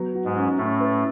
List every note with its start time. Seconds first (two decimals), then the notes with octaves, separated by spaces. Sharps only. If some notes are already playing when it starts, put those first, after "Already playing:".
Already playing: F#3 B3
0.15 F#4
0.25 G#2 G#3
0.36 C#4
0.58 A2 A3 C#4
0.80 B4